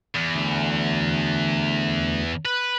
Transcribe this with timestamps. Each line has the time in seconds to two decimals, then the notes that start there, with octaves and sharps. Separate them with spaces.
0.15 E2
0.35 D2
2.45 B4